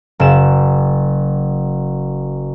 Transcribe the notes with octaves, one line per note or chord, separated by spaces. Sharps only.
F#1 E7